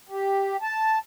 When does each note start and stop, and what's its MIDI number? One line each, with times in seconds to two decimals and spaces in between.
0.09 0.57 67
0.62 0.99 81